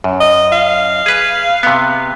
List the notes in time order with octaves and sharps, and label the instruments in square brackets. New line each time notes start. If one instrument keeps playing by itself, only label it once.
[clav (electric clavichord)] F#2
[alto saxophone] D#5
F5
[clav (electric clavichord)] G#4 B4
C3 B3